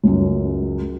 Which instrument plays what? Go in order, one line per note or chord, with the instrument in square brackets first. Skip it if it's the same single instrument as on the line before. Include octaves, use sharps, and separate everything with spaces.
[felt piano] C#2 F#2